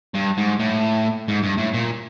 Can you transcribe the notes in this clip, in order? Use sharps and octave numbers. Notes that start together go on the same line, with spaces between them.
G2
G#2
A2
G#2
G2
A2
A#2